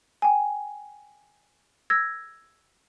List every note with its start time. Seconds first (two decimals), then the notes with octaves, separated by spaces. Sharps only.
0.22 G5 G#5
1.90 E6 G#6 A#6